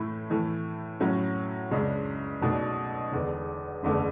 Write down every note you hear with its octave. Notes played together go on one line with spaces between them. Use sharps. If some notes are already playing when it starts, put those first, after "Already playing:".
Already playing: A2 E3 A3 E4
A2 E3 A3
A2 F#3 C#4
C#2 C#3 G#3 D4
B1 B2 A3 D4
E1 E2 D3
F#1 E2 D3 A3